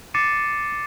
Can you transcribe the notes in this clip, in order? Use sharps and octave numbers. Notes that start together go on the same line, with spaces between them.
D6 A6 C7 C#7 D#7 E7